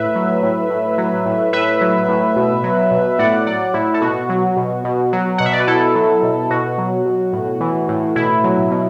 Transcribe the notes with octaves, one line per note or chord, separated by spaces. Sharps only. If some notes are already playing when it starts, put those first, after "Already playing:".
Already playing: A2 B4 E5
F#3
A2
A2
F#3
A2
A2 B4 E5
F#3
A2
B2
F#3
B2
A2 D5 F#5
F#3 D5 F#5
A2 E4
A4
B2 F#4
F#3
B2
B2
F#3
B2 F#5
E5
D5
B4
B2 E4 A4
F#3
B2
B2 F#4
F#3
B2
A2
E3
A2
B2 E4
F#3
B2